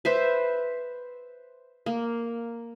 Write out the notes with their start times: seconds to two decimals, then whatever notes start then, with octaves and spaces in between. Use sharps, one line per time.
0.05 B4 C5 E5
1.86 A#3